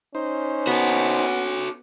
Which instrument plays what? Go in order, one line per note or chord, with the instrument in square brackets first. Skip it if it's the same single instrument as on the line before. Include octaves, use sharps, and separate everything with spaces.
[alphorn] C#4 [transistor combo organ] D#4 C5
[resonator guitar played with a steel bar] B3 [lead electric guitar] F#4 A4